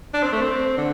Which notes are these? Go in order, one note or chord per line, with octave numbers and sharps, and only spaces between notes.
D4
C4
A3
C4
D3